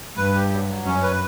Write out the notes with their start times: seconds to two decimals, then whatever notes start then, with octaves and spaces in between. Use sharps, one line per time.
0.17 G2 B4
0.35 G4
0.51 F#3
0.68 F#3
0.85 F#2 C#4
1.03 B4